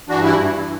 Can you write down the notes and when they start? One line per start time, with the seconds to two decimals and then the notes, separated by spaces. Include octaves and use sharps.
0.09 G2 E3 D4 F#4
0.24 E4